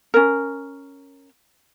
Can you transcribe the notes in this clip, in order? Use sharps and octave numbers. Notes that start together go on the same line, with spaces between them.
C#4 A#4